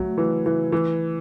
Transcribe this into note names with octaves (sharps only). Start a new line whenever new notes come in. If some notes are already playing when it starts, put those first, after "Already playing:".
Already playing: F#3 A3
E3
E3
E3